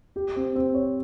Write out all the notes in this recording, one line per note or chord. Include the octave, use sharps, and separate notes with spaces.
G4
C4
C4
C#5